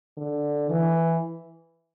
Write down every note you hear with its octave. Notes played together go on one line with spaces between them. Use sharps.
D3
E3